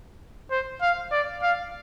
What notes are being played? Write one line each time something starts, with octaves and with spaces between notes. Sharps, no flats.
C5
F5
D5
F5